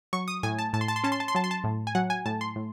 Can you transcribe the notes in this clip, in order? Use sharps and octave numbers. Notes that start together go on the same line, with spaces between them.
F#3 C#6
D#6
A2 G#5
A5
A2 A5
C6
A5
C6
C#4 A5
C6
A5
C6
F#3 A5
C6
A5
A2
G#5
F#3 F#5
G#5
A2 A5
C6
A2